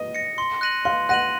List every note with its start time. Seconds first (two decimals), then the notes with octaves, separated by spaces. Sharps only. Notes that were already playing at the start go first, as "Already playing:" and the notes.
Already playing: D#5
0.15 A#6 C#7
0.38 C6
0.61 F#6 A#6 D#7 F#7
0.85 F5 C6
1.09 F#5 F#6 A#6 D#7 F#7